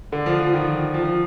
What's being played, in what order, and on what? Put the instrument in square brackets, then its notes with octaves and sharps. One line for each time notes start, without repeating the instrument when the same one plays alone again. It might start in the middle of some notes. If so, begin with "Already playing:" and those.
[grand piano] D3
F3
F3
D#3
F3
F3